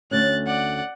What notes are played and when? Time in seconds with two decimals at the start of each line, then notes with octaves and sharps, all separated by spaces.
0.11 D2 C#4 F#6 A6
0.46 D5 F#5